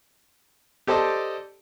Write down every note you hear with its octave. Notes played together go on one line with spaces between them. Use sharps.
G4 A4 C5 D5 D#5